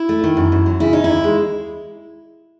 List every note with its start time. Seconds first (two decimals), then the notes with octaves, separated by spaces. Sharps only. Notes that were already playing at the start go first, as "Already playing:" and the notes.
Already playing: E4
0.09 A3
0.24 D#3
0.37 F#2
0.52 F#2
0.66 F#3
0.80 C#3 E4
0.93 C#4 D#4
1.04 E4
1.10 D#2
1.24 G#3